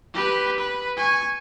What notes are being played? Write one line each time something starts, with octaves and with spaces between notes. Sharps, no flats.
G4 B4
B4
G#5 C#6